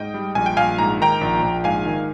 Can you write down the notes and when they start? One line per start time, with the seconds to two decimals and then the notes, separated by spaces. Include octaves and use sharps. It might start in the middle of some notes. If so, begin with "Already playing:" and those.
Already playing: G#2 D#5 G5
0.14 G3
0.35 A#1 G#5
0.46 G5
0.57 A#1 F5 G#5
0.78 G#2 A#5
1.00 D#3 G5 A#5
1.21 A#1
1.42 A#1
1.64 G#2 F5 G#5
1.86 D#3